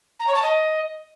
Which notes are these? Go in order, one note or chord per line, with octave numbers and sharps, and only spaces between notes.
A#5
C#5
A5
D#5